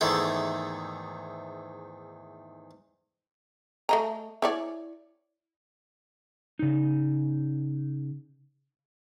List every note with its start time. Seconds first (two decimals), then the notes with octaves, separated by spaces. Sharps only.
0.01 E2 G#2 D#3 A3 E4 A4
3.89 A3 D#5 A#5
4.42 E4 C#5 D5
6.59 C#3 D#4